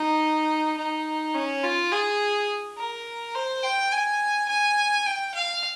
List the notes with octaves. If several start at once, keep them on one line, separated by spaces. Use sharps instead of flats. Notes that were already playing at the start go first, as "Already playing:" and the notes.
Already playing: D#4
D#4
C#4
F4
G#4
A#4
C5
G5
G#5
G#5
G5
F5